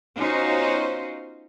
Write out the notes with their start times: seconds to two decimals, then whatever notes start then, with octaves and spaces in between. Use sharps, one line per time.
0.18 B3 C#4 D#4 F4 F#4 C5